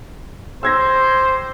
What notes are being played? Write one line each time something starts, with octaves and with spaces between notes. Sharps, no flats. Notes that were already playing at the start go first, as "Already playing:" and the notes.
G4 C5 E6 G#6 A#6